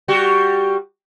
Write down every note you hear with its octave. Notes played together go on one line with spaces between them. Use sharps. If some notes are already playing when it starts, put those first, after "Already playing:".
G3 F#4 G4